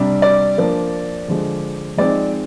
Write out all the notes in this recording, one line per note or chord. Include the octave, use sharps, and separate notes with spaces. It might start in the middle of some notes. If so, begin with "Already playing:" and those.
Already playing: C3 G3 D4
D5
F3 A#3 D4
D3 F3 G#3
F3 G#3 C4 D#4 D5